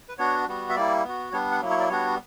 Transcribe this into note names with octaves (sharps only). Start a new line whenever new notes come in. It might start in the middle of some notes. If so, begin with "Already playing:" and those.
B4
B3 D4 F#4 C#5
G3 B3 F#4
E5
G3 A#3 E4 D5
B3 F#4
G3 B3 D4 C#5
F#5
F#3 A#3 E4
C#5
D5
G3 B3 D4 F#4 C#5